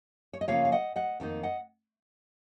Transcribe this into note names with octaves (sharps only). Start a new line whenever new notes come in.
C#5
D#5
C#3 F3 A#3 C#4 F4 C#5 F5
F5
D#5 F#5
D#5 F#5
F2 D#3 A#3 D#4
D#5 F#5